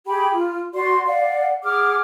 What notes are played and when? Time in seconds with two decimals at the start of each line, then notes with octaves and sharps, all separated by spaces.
0.07 G4 G#4 G5 B5
0.35 F4
0.74 F#4 D5 C6
1.06 D5 F5 F#5
1.63 G#4 F#5 D6 F6